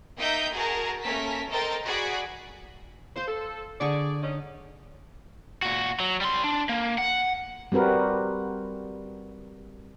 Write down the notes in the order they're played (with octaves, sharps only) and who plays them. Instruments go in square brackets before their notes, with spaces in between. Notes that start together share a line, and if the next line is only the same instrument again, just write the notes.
[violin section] A#3 D#4 E5 G5 D#6 G6
F#4 G#4 A#4 A5 A#5
A3 A#3 C#4 A#4 A5 B6
A4 A#4 C5 D#5 G5 A6
F#4 G#4 D5 B5
[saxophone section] C5 [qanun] F5 C6
[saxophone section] A4
[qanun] D3 C#6 [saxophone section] G#4 D5
[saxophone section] C#4 D#4
[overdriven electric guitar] A#2 F#4
F#3
G3 C6
D4
A#3
F#5
[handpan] G3 C4 F#4 A#4 B4